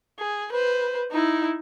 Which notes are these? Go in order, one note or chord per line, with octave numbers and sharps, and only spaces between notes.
G#4
B4 C5
D#4 E4